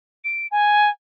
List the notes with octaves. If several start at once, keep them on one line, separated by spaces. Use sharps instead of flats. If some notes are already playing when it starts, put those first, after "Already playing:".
D7
G#5